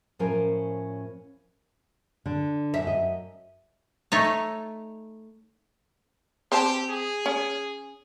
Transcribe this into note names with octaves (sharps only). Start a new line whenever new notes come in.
A2 F3 C#4 A#4 C5 G#5
D3
F#2 E5
D#5
A3 D#4 C#5
C4 G4 C5 A5
G#4
C#4